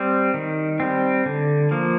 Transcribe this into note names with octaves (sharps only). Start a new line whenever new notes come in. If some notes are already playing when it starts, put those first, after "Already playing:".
Already playing: G3 C4
D#3
G3 C4
D3
F3 A#3